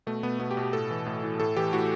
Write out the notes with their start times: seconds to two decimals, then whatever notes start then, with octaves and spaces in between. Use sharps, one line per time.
0.07 B2 A3
0.23 B2 B3
0.40 B2 B3
0.51 G4
0.57 B2
0.62 G4
0.73 A2 A4
0.90 E3
1.06 A2
1.24 E3
1.40 A2 A4
1.56 E3 G4
1.73 A2 F#4